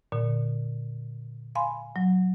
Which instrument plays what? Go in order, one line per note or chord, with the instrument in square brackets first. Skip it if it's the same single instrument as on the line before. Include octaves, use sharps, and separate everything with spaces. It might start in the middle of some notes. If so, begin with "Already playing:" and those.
[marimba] A#2 D3
F5 G#5 B5 C6
F#3